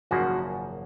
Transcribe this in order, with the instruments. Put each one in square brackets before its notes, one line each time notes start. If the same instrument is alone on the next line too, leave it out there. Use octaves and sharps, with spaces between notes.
[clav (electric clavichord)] G#1 F#2 C#3 F3 A#3 [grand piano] F#4